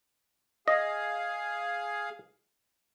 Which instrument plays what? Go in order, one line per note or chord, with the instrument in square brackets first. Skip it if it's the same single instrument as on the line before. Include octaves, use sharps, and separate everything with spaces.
[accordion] G#4 F5 [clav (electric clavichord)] D#5